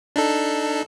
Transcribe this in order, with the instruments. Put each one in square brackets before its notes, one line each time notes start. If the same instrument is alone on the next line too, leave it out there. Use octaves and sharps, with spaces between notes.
[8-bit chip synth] D4 D#4 A4